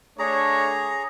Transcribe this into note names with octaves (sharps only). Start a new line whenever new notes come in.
A3 D4 G#4 C#5 A#5